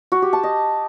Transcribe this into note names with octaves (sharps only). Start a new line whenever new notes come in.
F#4
G4
A5
D#5